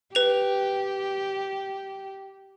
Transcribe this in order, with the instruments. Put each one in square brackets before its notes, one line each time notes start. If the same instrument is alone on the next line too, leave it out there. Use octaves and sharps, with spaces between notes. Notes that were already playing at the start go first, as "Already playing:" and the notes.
[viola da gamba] G4 [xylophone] B4 F7